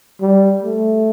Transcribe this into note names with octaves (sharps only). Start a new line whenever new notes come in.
G3
A3